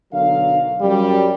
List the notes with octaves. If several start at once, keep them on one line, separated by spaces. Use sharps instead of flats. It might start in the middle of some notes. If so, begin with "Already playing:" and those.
B1 D3 F#3 A#4 F5
F#2 G3